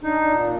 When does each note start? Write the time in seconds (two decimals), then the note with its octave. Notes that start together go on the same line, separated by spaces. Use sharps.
0.03 D4 D#4
0.27 A#2